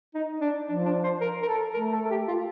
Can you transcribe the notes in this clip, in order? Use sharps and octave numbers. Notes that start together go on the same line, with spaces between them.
D#4
D4
F3 D4
D4
C5
A#4
A#4
A4
A3 A#4
A4
A4
G4
F4